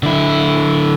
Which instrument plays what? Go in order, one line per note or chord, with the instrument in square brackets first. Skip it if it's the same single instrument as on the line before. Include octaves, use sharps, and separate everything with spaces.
[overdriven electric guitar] D3 E4